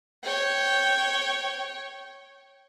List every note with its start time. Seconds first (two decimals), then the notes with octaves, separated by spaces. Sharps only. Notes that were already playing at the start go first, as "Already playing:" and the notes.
0.24 C#5 G5